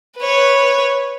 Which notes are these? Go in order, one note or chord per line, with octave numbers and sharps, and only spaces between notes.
B4 C#5